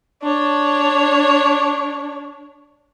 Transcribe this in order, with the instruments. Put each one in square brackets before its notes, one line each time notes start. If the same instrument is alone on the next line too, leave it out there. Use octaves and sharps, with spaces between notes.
[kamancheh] D4 C#5